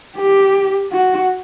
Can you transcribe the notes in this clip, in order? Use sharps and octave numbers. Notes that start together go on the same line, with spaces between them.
G4
F#4